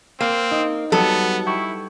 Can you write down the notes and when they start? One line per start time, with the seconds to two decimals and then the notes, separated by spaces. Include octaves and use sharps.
0.21 A#3 C4
0.51 D#4
0.92 F#3 G3 B3 A4
1.46 E4 G5 C#6